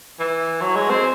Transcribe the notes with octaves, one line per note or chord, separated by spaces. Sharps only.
E3
F#3
G#3
C4